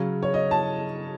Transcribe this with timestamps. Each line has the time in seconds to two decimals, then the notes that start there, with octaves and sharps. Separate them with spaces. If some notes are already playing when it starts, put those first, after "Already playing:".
Already playing: C#3 F#3 C#4
0.23 C#5
0.34 D#5
0.51 A5